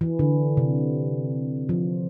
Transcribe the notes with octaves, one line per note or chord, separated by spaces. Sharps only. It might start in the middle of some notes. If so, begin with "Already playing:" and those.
E3
D3
C3
F3